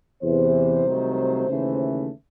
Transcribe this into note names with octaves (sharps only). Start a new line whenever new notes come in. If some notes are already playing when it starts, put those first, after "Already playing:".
E2 C3 E3 C5
C2 C3 D#3 F#3 A3
D#2 C#3 E3 A3